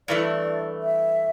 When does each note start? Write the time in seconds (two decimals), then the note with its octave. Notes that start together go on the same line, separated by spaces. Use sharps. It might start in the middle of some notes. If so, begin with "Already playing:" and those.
0.08 G2 E3 A3 D5
0.82 E5